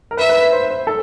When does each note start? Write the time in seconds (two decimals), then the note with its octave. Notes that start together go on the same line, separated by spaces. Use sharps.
0.11 A#4
0.17 B4 E5
0.29 B4
0.41 B4
0.52 C5
0.70 C5
0.87 A4